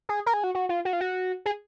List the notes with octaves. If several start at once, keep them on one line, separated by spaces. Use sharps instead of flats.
G#4
A#4
G#4
F#4
F#4
F4
F#4
F4
F#4
G#4